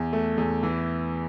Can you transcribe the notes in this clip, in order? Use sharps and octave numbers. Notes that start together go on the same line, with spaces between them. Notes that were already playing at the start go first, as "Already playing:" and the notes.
Already playing: E2
A3
E2
E3